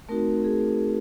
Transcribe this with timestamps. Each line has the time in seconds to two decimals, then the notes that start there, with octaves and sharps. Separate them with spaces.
0.09 A3 C4 D#4 F#4 A#4
0.44 G#4